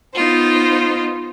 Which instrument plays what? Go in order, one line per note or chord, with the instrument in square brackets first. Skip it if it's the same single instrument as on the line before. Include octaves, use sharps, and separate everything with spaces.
[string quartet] B3 D#4 F4 C5